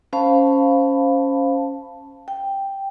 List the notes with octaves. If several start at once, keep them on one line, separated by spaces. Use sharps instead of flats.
C#4 C5 F5 A5 B5
G5